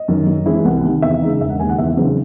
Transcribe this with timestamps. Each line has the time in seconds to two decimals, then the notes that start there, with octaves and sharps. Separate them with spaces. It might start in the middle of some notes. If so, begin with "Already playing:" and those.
Already playing: D#5
0.08 F#2 D#3
0.27 F#2
0.46 E3 G#3 C4 E4
0.65 C2 F#5
0.83 C3 D#3
1.02 E2 E5
1.22 C#3 G#3 D#4
1.40 E1 E5
1.49 F#5
1.59 D#2 C#3 G#5
1.69 F#5
1.78 E2 E5
1.97 C#3 F#3 C4 D#4